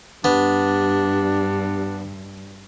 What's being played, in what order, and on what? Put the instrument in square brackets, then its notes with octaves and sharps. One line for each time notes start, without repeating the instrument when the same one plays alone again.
[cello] G2 [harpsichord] B3 [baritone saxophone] D4 [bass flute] G4